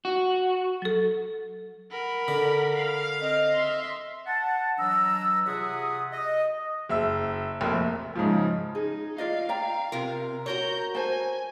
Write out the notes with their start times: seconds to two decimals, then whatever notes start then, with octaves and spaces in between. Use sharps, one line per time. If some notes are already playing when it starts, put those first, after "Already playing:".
0.05 F#4
0.82 F#3 A4
1.91 A#4 F#5 B5
2.28 D3
2.76 F5
3.21 C4 D#5
3.54 E5 C6
4.26 F#5 A5
4.78 E3 F#3 D4 D#5 A#5 E6
5.46 C3 F4 G#4 E5 F#5 D#6
6.12 D#5
6.89 F#1 E5 E6
7.61 F1 A#1 A#3
7.73 E5
8.15 G#2 C#3 F3
8.75 D#4 G#4
9.18 F4 D5 D#5 F5
9.49 D5 G5 A#5
9.92 C3 F4 A#4
10.46 F#4 A#4 C#5 A#5 G6
10.95 C5 G#5 A5